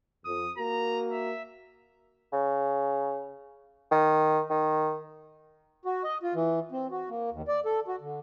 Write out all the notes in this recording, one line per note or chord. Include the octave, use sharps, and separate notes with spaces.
F2 D#6
A#3 F#4 A#4 A#5
E5
C#3
D#3
D#3
F#4
D#5
F4
E3
C4
F#4
A#3
D#2
D5
A4
F#4
D3